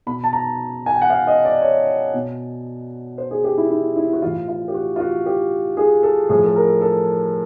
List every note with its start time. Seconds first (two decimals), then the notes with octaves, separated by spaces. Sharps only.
0.07 B2 B5
0.24 A5
0.33 A#5
0.86 G#5
0.94 G5
1.02 F#5
1.10 F5
1.27 D#5
1.45 D5
1.62 C#5
2.14 B2
3.18 C5
3.31 G#4
3.44 G4
3.57 E4
3.70 E4
3.96 E4
4.13 F#4
4.22 A2 E3 F4
4.48 F4
4.68 G4
4.74 F#4
4.96 F4
5.00 F#4
5.26 G4
5.77 G#4
6.03 A4
6.29 A2 F3 G#4
6.45 A4
6.56 A#4
6.81 A4